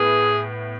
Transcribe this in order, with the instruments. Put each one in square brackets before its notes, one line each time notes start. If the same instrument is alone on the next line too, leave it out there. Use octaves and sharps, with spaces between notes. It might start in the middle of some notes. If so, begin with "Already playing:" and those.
Already playing: [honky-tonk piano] A2 B3 [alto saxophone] G#4